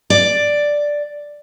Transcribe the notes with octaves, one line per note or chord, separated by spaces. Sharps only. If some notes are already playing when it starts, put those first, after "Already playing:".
D5